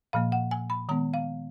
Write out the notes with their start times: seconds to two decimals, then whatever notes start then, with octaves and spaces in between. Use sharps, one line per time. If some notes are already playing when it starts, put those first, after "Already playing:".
0.13 A#2 F3 A#3 F5
0.32 F#5
0.51 G#5
0.70 B5
0.89 D#3 G#3 B3 A#5
1.14 F5